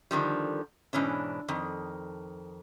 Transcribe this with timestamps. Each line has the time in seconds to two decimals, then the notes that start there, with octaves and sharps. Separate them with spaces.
0.11 D3 D#3 F3 G3
0.93 G#2 B2 E3 C#4 D4
1.48 F2 D#3